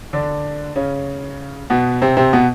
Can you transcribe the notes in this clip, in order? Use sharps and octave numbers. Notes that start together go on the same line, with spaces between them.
D3 D4
C#3 C#4
B2 B3
C3 C4
C3 C4
B2 B3